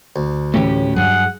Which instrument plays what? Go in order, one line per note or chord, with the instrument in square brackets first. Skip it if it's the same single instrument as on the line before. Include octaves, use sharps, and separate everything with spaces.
[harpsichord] D2
[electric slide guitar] A2 C#4 G4 [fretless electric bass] E3 A3
[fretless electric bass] G2 F#3 [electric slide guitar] G#4 [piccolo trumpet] F#5